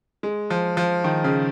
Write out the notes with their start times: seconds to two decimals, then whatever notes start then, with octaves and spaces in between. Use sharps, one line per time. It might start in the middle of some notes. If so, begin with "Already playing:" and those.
0.23 G#3
0.50 F3
0.77 F3
1.04 D#3
1.24 C#3